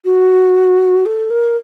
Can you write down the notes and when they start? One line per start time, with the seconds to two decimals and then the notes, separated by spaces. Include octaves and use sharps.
0.05 F#4
1.06 A4
1.30 A#4